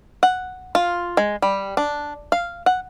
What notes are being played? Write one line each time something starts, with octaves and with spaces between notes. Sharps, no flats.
F#5
F4
G#3
G3
D4
F5
F#5